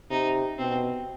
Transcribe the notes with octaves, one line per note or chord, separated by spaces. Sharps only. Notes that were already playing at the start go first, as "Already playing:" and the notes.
C3 D#4
B2 C4